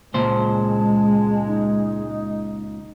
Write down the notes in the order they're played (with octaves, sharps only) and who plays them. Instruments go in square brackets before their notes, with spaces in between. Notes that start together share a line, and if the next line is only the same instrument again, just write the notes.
[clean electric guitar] C#2 A#2 C5 [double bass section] G#3 [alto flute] A5
[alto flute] D#4